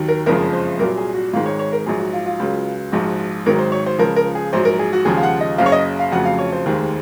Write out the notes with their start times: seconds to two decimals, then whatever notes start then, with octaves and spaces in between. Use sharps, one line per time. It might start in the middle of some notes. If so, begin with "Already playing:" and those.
Already playing: D#2 D#3 F#3
0.08 A#4
0.26 F#1 F2 C#3 F3 G#3 A#4
0.53 C5
0.79 C2 A#2 F#3 A#4
0.98 G#4
1.15 F#4
1.33 G#1 G#2 D#3 G#3 F4
1.46 C#5
1.59 C#5
1.73 A#4
1.86 A#1 G#2 F#3 G#4
2.00 F#4
2.13 F4
2.26 F4
2.39 C#2 C#3 F#3
2.92 A#1 G#2 F3 F#4
3.46 G#1 G#2 D#3 F#3 A#4
3.59 C5
3.72 C#5
3.86 C5
3.99 C#2 C#3 F3 A#4
4.16 A#4
4.35 G#4
4.53 A#1 G#2 F#3 C5
4.65 A#4
4.79 G#4
4.93 F#4
5.05 D#2 C#3 F3 G#3 G#4
5.17 F5
5.23 F#5
5.41 D#5
5.58 F#1 F#2 C#3 F5
5.66 C#5
5.72 D#5
5.99 F5
6.12 F1 F2 C#3 F#3 F#5
6.25 F5
6.39 C#5
6.53 C5
6.65 F1 D#2 D#3 G#3